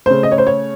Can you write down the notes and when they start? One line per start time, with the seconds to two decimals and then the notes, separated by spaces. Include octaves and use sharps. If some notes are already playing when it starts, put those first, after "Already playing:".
0.06 C#3 A3 C5
0.23 D#5
0.32 C#5
0.38 C5
0.47 C#5